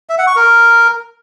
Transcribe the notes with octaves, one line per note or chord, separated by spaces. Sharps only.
E5
F#5
C#6
A#4